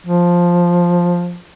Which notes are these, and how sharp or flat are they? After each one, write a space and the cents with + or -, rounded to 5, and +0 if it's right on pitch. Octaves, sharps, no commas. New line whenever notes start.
F3 +5